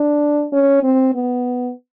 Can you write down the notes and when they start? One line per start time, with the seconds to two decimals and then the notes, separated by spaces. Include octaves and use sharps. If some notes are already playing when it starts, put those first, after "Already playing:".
Already playing: D4
0.53 C#4
0.83 C4
1.15 B3